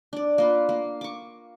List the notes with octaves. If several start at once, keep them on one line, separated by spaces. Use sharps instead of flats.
D4 D5
A#3 F4 B4
A#3
C#6 D6